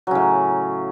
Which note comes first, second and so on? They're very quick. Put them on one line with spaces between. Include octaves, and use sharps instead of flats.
F#3 C#3 A2